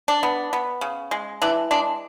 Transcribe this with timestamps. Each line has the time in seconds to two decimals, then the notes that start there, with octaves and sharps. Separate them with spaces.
0.08 D4
0.23 B3
0.53 B3
0.81 C#3
1.11 G#3
1.42 E3 D4
1.71 G#3 D4